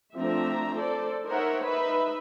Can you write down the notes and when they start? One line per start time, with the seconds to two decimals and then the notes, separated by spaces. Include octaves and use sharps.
0.16 F3 A3 C4 D4 E5 A#5
0.77 A4 C5 D5
1.27 D#4 A#4 C5 C#5 E5 F#5
1.63 D#4 B4 E5 B5